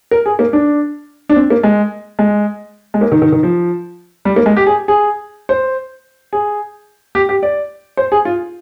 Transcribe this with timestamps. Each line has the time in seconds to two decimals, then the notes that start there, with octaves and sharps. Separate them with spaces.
0.11 A#4
0.26 G#4
0.39 A#3
0.53 D4
1.29 D4
1.36 C4
1.50 A#3
1.63 G#3
2.19 G#3
2.94 G#3
3.01 A#3
3.12 D#3
3.22 D#3
3.32 D#3
3.43 F3
4.25 G3
4.36 A#3
4.46 G#3
4.57 G4
4.67 G#4
4.88 G#4
5.49 C5
6.33 G#4
7.15 G4
7.29 G4
7.43 D5
7.97 C5
8.12 G#4
8.25 F4